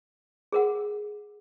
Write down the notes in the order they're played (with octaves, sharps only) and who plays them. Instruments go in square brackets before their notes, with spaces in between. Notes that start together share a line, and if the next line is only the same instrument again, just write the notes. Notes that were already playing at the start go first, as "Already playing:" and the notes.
[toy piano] G#4 A#4 F#5